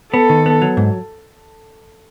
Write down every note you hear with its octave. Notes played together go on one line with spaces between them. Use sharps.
B3 A4
D#3
B3
F#3
G#2